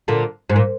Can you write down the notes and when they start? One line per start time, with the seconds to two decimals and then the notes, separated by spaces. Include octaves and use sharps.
0.08 A#2 D3
0.50 G#2
0.56 A#2